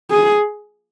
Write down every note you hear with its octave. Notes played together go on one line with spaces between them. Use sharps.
G#4